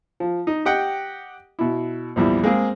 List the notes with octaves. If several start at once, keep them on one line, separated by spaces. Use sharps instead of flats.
F3
D#4
G4 D#5 F#5 G5
B2 E4
A#1 E2 G3 E4
G#3 A#3 C4 G#4